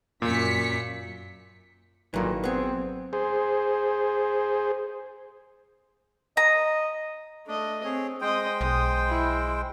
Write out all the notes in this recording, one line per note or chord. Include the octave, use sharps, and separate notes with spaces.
F#2 A#2 B6 C#7
G#1 A#2 D#3 E3 F#3 A4
B3 C4 G#4
G#4 C5
D#5 A#5
A3 D4 D#5
C4 G#4 C#5
G#3 C5 D#5 G5 D#6
B1 D#6
E4